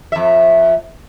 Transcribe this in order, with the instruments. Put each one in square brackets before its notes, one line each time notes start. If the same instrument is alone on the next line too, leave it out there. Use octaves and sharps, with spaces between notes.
[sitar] F2 E5